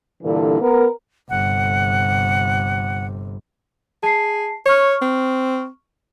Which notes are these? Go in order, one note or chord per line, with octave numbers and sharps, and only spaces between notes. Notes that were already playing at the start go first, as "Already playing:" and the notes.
G2 A#2 D3 E3 A4
B3 A#4
G1 C3 F#5
G#4 A5 C7
C#5 C#6 F6
C4